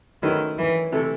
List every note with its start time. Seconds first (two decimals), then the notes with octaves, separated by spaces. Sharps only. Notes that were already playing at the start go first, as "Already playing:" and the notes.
0.22 F#2 D#3 F#3 A3 E4 B4
0.58 E3
0.92 C3 E3 A3 E4 A4